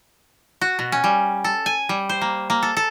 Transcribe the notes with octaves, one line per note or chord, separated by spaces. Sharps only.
F#4
B2
C#4
G3
A4
G#5
G3
C5
A#3
A#3
A4
A4